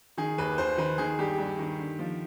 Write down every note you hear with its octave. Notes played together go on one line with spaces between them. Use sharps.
D#3 G#4
D#2 B4
D#2 C5
D#3 B4
D#3 G#4
G2 G4
G2
D#3
D3
F3